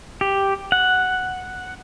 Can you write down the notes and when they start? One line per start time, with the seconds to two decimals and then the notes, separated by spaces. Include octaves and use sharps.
0.21 G4
0.72 F#5